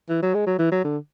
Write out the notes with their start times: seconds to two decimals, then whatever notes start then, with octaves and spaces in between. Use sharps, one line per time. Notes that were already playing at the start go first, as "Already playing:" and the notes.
0.09 E3
0.22 F#3
0.34 G#3
0.47 F#3
0.59 E3
0.71 F#3
0.84 D3